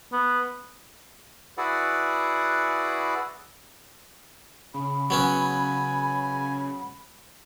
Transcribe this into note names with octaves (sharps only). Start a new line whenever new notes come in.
B3
E4 F#4 G#4 B4 D5 F#5
C#3 B5
F#3 B3 C#4 G#5